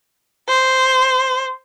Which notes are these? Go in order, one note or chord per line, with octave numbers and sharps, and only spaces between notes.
C5